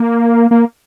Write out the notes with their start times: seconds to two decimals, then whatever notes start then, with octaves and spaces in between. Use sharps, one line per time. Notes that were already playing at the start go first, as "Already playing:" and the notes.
Already playing: A#3
0.51 A#3